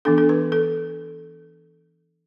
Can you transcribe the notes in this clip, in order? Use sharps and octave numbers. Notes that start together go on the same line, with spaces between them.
E3 B3 D4 A4
A4
B4
A4